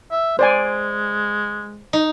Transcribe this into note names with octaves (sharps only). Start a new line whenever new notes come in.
E5
G#3 C5 D5 G#5
D#4